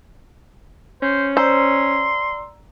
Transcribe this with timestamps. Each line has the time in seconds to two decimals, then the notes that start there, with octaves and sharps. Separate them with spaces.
1.02 C#4 C5
1.37 C5 D5 A#5 C6 E6